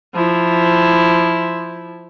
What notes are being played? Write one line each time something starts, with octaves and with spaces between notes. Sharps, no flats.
F3 E4